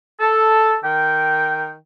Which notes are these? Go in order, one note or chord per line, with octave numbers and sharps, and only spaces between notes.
A4
D#3 A#4 G5